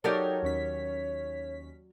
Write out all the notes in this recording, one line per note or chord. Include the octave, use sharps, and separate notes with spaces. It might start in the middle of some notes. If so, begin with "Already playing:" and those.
F#3 D#4 G4 A4 A#4 C#5 D5
D#2 C#4 B6